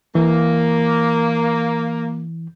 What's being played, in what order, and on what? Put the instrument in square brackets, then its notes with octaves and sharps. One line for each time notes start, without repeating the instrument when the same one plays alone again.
[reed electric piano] E3 [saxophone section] A#3